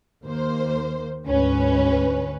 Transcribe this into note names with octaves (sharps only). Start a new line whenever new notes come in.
D#2 A#3 C5
D2 G#2 C#4 B4